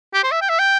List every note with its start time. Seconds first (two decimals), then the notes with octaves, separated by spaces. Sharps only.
0.14 G4
0.23 C5
0.32 E5
0.41 G5
0.49 E5
0.59 G5